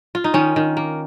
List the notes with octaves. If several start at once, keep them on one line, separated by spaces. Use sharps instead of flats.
F4
D#4
D#3 C#4
D#3
A#3